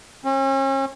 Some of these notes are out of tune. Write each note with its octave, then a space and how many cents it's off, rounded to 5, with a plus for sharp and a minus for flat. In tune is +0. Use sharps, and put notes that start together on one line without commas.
C#4 -40